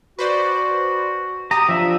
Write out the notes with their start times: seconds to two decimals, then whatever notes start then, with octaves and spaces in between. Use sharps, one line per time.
0.19 F#4 B4 C5 D5
1.51 G4 A#5 D#6
1.69 F3 D4 E5